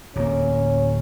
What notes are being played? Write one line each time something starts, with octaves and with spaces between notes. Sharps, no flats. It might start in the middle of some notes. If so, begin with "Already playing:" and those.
D1 A#3 C#4